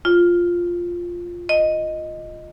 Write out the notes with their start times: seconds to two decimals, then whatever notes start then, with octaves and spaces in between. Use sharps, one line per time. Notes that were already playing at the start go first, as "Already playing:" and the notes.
0.05 F4
1.49 D#5